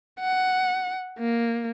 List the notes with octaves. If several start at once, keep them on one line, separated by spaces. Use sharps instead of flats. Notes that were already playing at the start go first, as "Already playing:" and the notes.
F#5
A#3